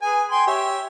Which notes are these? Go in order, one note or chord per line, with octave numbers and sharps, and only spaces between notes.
G#4 B4 G#5
G5 G#5 C6
G4 C#5 E5